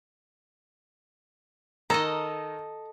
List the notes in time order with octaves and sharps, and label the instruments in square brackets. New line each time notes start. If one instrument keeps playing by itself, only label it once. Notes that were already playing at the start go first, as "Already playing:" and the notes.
[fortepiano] D#3 [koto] A4 D#5 [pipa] A#5